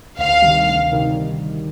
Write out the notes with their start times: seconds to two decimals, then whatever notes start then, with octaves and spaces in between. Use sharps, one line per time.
0.18 D2 F5
0.42 C3 D#3 G3
0.67 D2
0.91 C3 D#3 G3